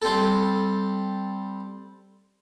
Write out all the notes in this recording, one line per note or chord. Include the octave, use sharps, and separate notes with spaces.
G3 C4 A4